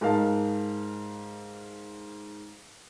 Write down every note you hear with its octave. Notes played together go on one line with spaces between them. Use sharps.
G#2 G#4 A#4 F5 A5